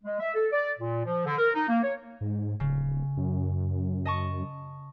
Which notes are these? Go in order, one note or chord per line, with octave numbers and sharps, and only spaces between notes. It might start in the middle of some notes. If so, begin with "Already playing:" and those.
G#3
E5
A4
D5
A#2
F3
D3
A#4
D#4
A#3
C#5
G#2
D1 C#3
F#2
D#5 A5 C#6